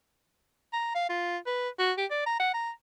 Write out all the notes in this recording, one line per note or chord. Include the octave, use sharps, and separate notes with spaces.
A#5
F5
F4
B4
F#4
G4
D5
A#5
F#5
A#5